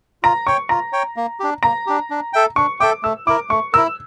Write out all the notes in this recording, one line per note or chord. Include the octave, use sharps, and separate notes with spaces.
F4 A#5
C#5 G5 C#6
F4 A#5
C#5 G5
A#3
D4 G4
A#3 A#5
D4 G4
D4
A4 E5 G5
D4 C#6
A4 E5 G5 D6
A3 E6
E4 A#4 D6
A3 C#6
E4 A#4 E6